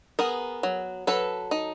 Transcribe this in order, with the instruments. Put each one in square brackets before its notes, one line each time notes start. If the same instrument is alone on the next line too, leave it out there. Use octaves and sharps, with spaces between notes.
[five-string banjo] B3 G#4 A#4
F#3
F#3 A4 B4
D#4